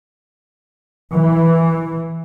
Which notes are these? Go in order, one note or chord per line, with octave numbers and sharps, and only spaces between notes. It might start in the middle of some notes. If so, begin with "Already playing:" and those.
E3